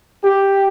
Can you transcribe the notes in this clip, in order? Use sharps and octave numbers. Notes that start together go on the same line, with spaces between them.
G4